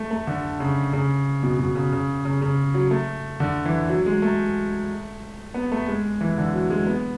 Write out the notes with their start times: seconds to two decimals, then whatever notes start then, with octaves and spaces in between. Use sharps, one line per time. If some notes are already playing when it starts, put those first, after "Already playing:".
Already playing: A3
0.11 A3
0.27 D3
0.60 C#3
0.93 C#3
1.43 B2
1.59 B2
1.75 C#3
1.92 C#3
2.25 C#3
2.41 C#3
2.74 F#3
2.91 A3
3.40 D3
3.65 E3
3.89 F#3
4.06 G#3
4.22 A3
5.54 B3
5.72 A3
5.88 G#3
6.21 E3
6.38 D3
6.54 F#3
6.70 G#3
6.87 B3